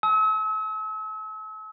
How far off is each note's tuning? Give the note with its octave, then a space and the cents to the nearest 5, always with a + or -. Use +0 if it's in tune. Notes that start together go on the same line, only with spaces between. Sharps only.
A5 -35 E6 -40